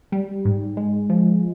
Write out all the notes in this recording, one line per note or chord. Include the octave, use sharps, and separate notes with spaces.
G3
G#2
G#3
F3